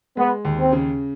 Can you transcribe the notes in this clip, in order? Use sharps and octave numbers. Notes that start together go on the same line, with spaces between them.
G#3 B3
D#2
C4
C#3